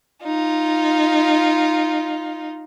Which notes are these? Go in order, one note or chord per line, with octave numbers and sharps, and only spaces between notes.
D#4 F4